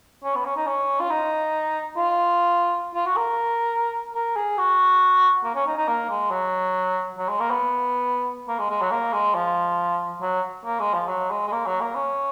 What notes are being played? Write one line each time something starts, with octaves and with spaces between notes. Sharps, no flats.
C#4
B3
C#4
D#4
C#4
F4
D#4
F4
F4
F#4
A#4
A#4
G#4
F#4
A#3
C#4
D#4
D#4
A#3
G#3
F#3
F#3
G#3
A#3
B3
A#3
G#3
G#3
F#3
A#3
G#3
F3
F#3
A#3
G#3
F3
F#3
G#3
G#3
A#3
F#3
A#3
C#4